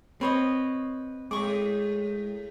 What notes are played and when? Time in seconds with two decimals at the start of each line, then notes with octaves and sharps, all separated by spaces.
0.21 C4 B4 C#5 D#5
1.31 A2 G#3 G#4 C#6 D6